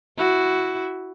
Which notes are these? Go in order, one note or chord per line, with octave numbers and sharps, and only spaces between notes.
E4 F#4